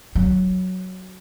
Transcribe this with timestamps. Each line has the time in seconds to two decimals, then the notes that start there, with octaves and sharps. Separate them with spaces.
0.15 F#3